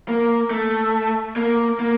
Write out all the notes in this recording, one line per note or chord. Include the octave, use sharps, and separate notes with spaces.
A#3
A3
A#3
A#3